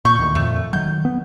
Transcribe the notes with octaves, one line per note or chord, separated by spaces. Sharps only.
A#2 C#6 G6
D2 D#3
F2 A#2 A3
D#3 F#3 G6
B3